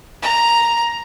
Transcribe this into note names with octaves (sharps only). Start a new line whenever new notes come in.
A#5